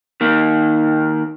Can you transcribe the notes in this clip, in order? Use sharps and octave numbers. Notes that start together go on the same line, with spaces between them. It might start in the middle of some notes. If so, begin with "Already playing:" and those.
D#3 A#3